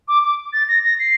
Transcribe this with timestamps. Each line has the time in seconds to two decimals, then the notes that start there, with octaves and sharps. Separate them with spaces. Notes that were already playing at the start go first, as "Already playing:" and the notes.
0.08 D6
0.24 D6
0.53 A6
0.68 A#6
0.84 A#6
0.99 C7